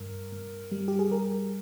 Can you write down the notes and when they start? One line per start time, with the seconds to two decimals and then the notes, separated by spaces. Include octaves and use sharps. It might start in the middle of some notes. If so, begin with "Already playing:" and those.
Already playing: G2 A#4
0.32 G2
0.72 G3
0.88 G4
0.99 G#4
1.11 G3 A#4